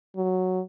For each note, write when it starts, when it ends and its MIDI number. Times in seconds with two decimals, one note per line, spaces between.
0.16 0.60 54